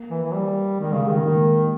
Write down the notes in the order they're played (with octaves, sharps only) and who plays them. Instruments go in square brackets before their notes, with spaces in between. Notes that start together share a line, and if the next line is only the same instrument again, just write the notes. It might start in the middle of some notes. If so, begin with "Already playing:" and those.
Already playing: [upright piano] A#3
[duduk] E3
E3
G3
[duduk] D#3 [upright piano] G#3
[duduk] C#3 [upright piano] G#3
[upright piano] G3
[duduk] D#3 [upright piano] G#3
[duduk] D#3 [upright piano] A#3